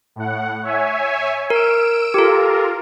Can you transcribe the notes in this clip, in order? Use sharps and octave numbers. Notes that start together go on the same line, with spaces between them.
A2 F#5
C#5 E5 G#5
A#4 E6 D7 E7
F4 G4 A4 A#4